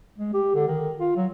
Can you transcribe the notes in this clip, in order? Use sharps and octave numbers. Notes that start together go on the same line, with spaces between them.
G#3
G4
D3
D#3
F4
F#3